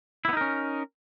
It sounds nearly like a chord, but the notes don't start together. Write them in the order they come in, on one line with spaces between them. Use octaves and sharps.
E4 B3 D#4 A#4 C#4